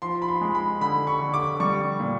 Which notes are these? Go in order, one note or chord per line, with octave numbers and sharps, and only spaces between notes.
F3 C6
B5
C6
G#3
B5
D3 B5
C#6
D3
D6
G3 C#6
A#2